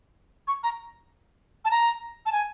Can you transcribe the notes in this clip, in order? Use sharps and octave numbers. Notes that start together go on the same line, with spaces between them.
C#6
A#5
A5
A#5
A5
G#5